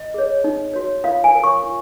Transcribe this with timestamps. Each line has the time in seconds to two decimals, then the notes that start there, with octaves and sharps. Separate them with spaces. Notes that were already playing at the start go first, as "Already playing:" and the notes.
Already playing: D#5
0.14 G#4 C#5
0.44 D#4
0.74 F#4 C#5
1.04 F4 F5
1.24 G#5
1.34 A#4 C#5
1.44 C#6
1.64 F4